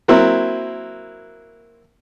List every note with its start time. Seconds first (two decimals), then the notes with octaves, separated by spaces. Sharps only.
0.08 F#3 A#3 C4 E4